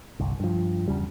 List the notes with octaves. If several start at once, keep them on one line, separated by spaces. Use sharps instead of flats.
G1 C2
G2 F3
E2 C#3 G3